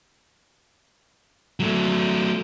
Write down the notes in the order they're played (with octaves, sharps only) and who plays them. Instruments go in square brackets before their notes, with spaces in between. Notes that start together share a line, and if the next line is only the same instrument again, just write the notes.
[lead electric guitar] F#3 A3